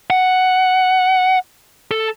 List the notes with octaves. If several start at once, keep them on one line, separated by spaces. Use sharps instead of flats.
F#5
A4